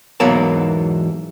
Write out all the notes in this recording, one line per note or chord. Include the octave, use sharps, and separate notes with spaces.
E2 G#2 B2 F#3 A#3 A5